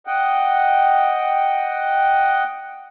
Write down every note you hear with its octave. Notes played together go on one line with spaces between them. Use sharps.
D#5 F#5 G5